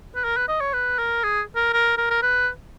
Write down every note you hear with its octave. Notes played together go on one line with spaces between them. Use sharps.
B4
A#4
B4
D#5
C#5
B4
A#4
G#4
A#4
A#4
A#4
A#4
B4